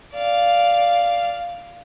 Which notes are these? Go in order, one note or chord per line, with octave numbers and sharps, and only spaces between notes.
D5 F5